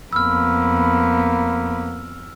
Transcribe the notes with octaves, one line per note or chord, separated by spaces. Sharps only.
F2 A#3 B3 B5 E6 F6